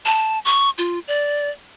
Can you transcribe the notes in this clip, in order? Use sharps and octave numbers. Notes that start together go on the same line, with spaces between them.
A5
C#6
F4
D5